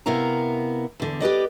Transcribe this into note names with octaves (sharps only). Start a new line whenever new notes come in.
C3 B3 E4 A#4 F5 A#5
E2 D3
G4 B4 D5 D#5